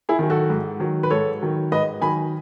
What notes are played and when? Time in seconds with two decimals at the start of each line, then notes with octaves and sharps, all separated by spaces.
0.09 E4 G#4
0.19 D#3 F#3
0.30 F#4 A4
0.50 G#2
0.80 D#3 F#3
1.03 B4
1.10 G#2 A4 C#5
1.42 D#3 F#3
1.72 G#2 B4 D#5
2.01 D#3 F#3 G#5 B5